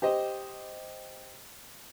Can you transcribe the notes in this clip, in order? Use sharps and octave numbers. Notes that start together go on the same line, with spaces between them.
G4 C5 D#5